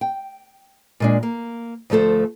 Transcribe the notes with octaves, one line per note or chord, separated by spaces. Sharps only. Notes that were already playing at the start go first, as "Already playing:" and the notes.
G5
A#2 G#3 D4
A#3
D2 F3 A3 A4 C5